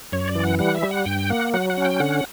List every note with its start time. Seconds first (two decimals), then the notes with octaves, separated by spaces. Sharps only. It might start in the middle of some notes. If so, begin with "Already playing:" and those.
0.12 F#2 C#5
0.28 D5
0.35 E3
0.44 F#5
0.59 G3 F#5
0.75 E5
0.83 G3
0.91 F#5
1.06 G2 G5
1.30 A#3 F#5
1.54 F#3 F#5
1.70 F#5
1.77 C#4
1.85 G5
2.00 D3 F#5